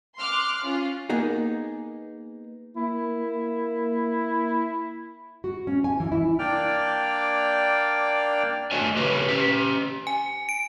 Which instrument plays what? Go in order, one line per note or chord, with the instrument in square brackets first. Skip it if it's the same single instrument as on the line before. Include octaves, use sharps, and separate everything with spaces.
[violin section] C6 D6 F6 F#6
C#4 F4
[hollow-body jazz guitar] A#3 B3 D#4 G#4
[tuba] A#3 [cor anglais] E4
[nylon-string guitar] F#4
C#4
G#5
E3
E4
[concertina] A#3 D4 D5 G5 F6
[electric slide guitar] A3 D4 F#4 C#5 D#5 G#5
C#3 G4 B4 C#5
C#4 G4
[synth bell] G#5
D7